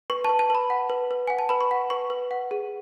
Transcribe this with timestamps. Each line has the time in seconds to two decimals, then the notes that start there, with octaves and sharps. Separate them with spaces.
0.10 B4 C#6
0.24 B4 A5
0.39 A5
0.50 B4 B5
0.70 F#5
0.90 B4
1.11 B4
1.27 F#5 G#5
1.39 A5
1.49 B4 B5
1.61 C#6
1.71 F#5
1.90 B4 C#6
2.10 B4
2.31 F#5
2.51 G#4